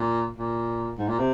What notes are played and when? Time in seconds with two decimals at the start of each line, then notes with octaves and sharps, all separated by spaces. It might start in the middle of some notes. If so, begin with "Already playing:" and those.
Already playing: A#2
0.37 A#2
0.98 G#2
1.08 A#2
1.19 C3